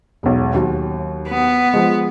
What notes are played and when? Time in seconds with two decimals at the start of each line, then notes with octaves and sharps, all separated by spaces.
0.23 E1 B1
0.54 D#2 F#3
1.29 B3
1.73 F3 G#3